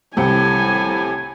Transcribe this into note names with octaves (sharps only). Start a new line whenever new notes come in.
C2 A2 C3 G4 G#5 C#7 G7